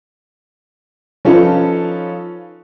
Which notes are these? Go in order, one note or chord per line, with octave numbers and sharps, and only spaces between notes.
F3 C#4 D#4 F4 A4 B4